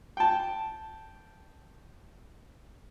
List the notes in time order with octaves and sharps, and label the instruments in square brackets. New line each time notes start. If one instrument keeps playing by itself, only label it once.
[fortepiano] G5 A5